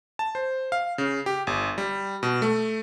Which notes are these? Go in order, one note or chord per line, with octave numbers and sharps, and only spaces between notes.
A5
C5
F5
C#3
G4
G1
G3
B2
A3